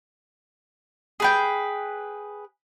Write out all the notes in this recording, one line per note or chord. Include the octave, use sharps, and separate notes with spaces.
G#4 B4 G5